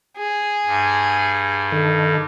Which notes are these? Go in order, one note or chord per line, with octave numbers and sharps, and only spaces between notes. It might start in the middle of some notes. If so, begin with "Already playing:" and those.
G#4
G2
D#3 A4